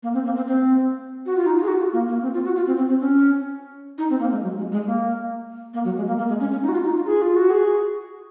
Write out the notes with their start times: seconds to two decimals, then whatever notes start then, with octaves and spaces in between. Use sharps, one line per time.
0.03 A#3
0.14 C4
0.25 A#3
0.36 C4
0.47 C4
1.26 F#4
1.36 F4
1.46 D#4
1.57 F4
1.63 G#4
1.67 F#4
1.79 F4
1.93 A#3
2.08 A#3
2.22 C4
2.33 F4
2.45 F#4
2.55 F4
2.67 C4
2.77 C4
2.89 C4
3.00 C#4
3.98 D#4
4.10 C4
4.20 A#3
4.31 G#3
4.42 F#3
4.57 G#3
4.72 G#3
4.86 A#3
5.74 A#3
5.85 F#3
5.97 G#3
6.07 A#3
6.18 A#3
6.29 G#3
6.40 C#4
6.51 C#4
6.62 D#4
6.68 F#4
6.73 F4
6.84 D#4
6.95 F4
7.06 G#4
7.22 F4
7.36 F#4
7.50 G#4